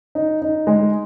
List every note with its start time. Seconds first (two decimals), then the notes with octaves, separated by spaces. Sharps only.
0.15 D#4
0.42 D#4
0.67 G#3